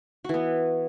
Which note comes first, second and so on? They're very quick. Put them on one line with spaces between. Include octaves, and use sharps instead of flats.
F#4 E3 B3